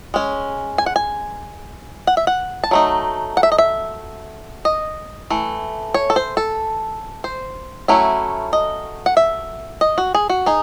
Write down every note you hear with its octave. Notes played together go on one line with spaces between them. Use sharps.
G#3 C#4
G#5
F#5
G#5
F#5
E5
F#5
A5
F#3 A3 D#4
F#5
E5
D#5
E5
D#5
E3 A3
C#5
A4
C5
A4
C5
F#3 A3 C#4 E4
D#5
F#5
E5
D#5
F#4
G#4
F#4
D#4 G#4